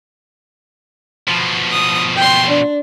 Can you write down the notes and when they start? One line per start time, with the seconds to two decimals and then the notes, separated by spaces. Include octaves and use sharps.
1.27 B2 F3
1.72 D#6
2.16 G5 C6
2.48 D4